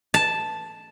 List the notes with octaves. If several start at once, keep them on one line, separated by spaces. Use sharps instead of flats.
A5